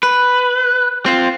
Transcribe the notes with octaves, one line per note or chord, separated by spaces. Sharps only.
B4
C4 F4